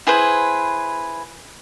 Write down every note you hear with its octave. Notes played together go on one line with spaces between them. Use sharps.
E4 G#4 B4 C5